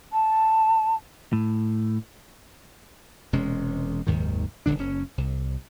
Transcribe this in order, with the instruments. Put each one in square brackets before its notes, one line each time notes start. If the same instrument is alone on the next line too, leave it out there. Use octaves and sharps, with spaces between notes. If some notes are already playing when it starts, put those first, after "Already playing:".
[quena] A5
[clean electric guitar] A2
[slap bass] E1 C3 G#3 C#4
F#1 D#2 G#2 D#3
D#1 F2 D3 D4
F#1 C#4
C2